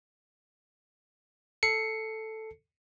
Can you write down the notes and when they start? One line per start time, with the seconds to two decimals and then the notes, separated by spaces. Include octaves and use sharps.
1.63 A4 C7 C#7